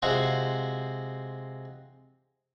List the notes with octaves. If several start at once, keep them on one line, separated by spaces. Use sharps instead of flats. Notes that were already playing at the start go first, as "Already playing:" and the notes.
C3 G#3 F4 F#4 C5